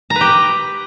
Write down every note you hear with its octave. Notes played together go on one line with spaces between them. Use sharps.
A#5
B4
G4